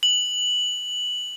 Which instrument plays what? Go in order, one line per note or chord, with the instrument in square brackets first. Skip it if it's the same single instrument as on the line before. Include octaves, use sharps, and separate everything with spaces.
[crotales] F#7